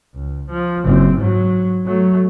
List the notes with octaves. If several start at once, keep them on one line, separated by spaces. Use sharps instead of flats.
C#2
F3
F#1 C4
G#2 F#3
F#3 A3